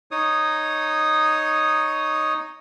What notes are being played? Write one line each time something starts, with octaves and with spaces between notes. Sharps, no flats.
D#4 C#5 D#6